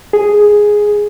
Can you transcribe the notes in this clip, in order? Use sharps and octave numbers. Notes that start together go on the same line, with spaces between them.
G#4